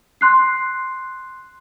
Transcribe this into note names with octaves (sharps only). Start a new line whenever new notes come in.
C6 F#6 C7